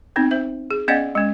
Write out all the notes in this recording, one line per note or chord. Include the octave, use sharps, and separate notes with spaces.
B3 C4 D#4
C5 E5
G#4
B3 C#4 D5 D#5 F5 F#5
G#3 C#4